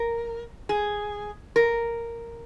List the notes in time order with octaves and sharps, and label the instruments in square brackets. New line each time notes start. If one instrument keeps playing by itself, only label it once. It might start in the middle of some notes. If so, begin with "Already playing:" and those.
Already playing: [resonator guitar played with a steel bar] A#4
G#4
A#4